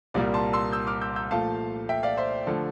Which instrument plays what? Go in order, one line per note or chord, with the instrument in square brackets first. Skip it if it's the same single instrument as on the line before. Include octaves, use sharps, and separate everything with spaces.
[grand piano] C2 A#2 G3 A#3 D5
A5 C6
C6 E6
E6 G6
D6 F6
E6 G6
E6 G6
A#2 F3 A3 F5 A5
E5 G5
D5 F5
C5 E5
D3 F3 A3